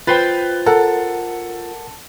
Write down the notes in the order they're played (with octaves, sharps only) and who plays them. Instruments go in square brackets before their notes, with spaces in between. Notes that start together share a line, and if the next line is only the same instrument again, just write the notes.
[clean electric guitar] F4 C5 G5 [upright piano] B4
[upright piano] A4 [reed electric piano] A#4 F#5